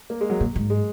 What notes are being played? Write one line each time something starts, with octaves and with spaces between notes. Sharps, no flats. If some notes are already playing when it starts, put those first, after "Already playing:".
A#3
G#3
F#3
A#2
G#2
G#3